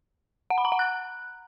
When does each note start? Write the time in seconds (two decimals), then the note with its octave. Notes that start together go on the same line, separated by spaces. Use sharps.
0.50 F#5
0.58 B5
0.65 A#5
0.72 F#5
0.79 F#6